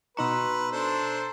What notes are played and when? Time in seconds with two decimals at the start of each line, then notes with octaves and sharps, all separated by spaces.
0.17 B2 D#4 B4 A#5 C6 C#6 E6
0.72 D4 A4 C5